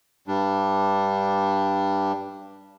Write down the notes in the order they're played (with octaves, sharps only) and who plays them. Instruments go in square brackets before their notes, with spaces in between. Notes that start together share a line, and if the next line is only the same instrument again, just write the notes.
[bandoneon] G2 G3 D4